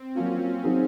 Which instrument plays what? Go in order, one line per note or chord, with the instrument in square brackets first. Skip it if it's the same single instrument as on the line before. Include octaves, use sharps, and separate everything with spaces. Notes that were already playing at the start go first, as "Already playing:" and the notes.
Already playing: [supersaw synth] C4
[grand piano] F#3 A#3 F4 [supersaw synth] C#4
[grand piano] F#3 C4 D#4 G#4